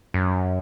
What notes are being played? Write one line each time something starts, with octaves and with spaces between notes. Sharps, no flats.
F#2